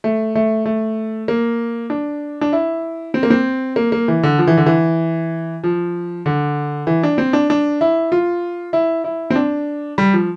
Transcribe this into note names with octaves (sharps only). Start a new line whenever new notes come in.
A3
A3
A3
A#3
D4
D4
E4
C4
A#3
C4
A#3
A#3
E3
D3
F3
E3
D3
E3
F3
D3
E3
D4
C4
D4
D4
E4
F4
E4
E4
C4
D4
G3
F3